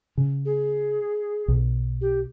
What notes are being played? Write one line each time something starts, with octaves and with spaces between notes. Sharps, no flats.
C#3
G#4
B1
G4